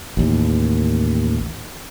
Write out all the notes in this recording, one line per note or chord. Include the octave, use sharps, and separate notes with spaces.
A1 D#2